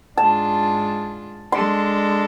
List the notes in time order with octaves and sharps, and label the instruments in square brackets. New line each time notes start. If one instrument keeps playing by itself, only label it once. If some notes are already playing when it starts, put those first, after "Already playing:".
[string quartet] G#2 G#3 D4 F4 [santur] A5
[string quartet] G#3 D4 A4 [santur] C6